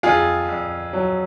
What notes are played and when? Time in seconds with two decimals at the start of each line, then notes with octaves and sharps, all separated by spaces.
0.03 F2 F4 G#4
0.48 F2
0.93 F#3